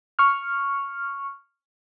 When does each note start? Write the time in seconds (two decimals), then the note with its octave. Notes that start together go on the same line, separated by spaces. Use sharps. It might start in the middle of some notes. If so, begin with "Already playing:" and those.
0.19 C#6 F6